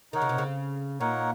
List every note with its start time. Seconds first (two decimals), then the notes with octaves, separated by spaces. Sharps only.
0.13 D#3 D#4 A#4 C#5 F#5
0.22 C#3
0.29 C3
0.38 C#3
1.00 A#2 D#4 A#4 C#5 F#5